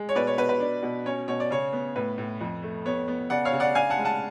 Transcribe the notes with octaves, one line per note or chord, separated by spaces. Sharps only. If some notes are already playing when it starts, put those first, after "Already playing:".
Already playing: G#3
C#5
B2 B4 D5
C#5
B2 B4
B4
D4
B2
C#4 C#5
B2 C#5
D5
C#3 C#5
B3
A2 B4
A2
F2
A3
B3 C#5
B3
C#3 D5 F#5
C#5 F5
C#3
D5 F#5
D4 F5 G#5
F#5 A5
G#3
F#5 A5